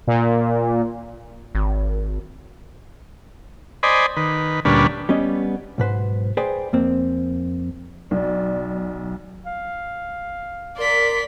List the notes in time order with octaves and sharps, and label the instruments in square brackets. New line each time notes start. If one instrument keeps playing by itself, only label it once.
[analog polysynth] A#2
[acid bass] G#1
[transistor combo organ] C5 D5 D#5 G#5 B5
D#3 B4
D2 A#2 G3 C#4 D4 B4
[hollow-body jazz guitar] G3 B3 C#4 D#5
B1 G#2 B4 C5
G#4 B4 C5 D5 G5 G#5
F2 A#3 C4
[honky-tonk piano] B1 [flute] D5
[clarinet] F5
[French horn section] A#4 [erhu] D5 [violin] C6 B6